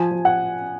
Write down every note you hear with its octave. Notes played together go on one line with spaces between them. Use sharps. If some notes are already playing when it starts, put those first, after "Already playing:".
Already playing: F3 G#5
F3
F#5